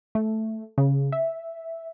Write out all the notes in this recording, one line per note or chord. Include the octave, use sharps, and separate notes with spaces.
A3
C#3
E5